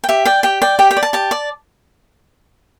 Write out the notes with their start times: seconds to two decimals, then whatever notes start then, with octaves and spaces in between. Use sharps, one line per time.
0.04 G5
0.09 G4 E5
0.25 D5 G5
0.43 G4 G5
0.62 D5 G5
0.79 G4 G5
0.91 G5
0.97 D5
1.03 A5
1.13 G4 A5
1.31 D5